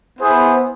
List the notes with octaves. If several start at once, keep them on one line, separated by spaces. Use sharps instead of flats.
B3 E4 G#4 C5